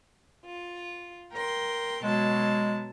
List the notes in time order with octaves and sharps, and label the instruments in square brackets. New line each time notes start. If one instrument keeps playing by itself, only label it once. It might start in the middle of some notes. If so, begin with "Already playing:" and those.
[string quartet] F4
A#4 G5 C6
[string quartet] B2 F#3 A5 [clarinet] G#3